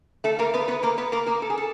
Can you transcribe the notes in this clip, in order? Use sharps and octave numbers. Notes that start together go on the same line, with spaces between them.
A3 A4
A#3 A#4
B3 B4
B3 B4
A#3 A#4
B3 B4
A#3 A#4
A#3 A#4
A4
G#4
A4